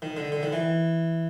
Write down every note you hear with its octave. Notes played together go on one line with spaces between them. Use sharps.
D#3
D3
D3
D#3
E3